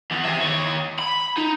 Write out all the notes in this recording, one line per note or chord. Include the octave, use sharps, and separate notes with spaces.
E2
C5 E5
D#3 C#5
B5
D#4